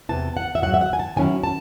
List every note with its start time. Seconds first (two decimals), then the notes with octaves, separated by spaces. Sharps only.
0.09 E2 C3 E3 A5
0.37 F#5
0.55 E5
0.62 G#2 D#3 F#3 F#5
0.74 E5
0.81 F#5
0.93 G#5
0.99 A5
1.16 D#3 F#3 C#4 E4 G#5
1.44 A5